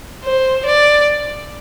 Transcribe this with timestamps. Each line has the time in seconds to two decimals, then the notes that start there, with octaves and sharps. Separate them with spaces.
0.24 C5
0.66 D5